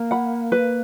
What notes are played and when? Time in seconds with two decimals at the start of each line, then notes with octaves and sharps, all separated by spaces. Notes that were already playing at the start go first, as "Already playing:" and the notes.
Already playing: A#3
0.11 F#5 B5
0.52 B4